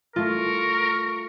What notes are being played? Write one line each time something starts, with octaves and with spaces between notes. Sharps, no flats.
A3 F4 A#4 C#6